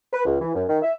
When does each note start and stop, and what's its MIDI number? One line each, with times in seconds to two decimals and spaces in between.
0.12 0.23 71
0.26 0.40 37
0.41 0.51 52
0.55 0.63 42
0.68 0.78 51
0.82 0.94 76